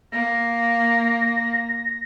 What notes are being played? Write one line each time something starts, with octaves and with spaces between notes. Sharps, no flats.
A#3 A#6